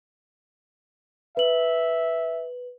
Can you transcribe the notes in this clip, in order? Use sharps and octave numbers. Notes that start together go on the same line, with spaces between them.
B4 E5 F#7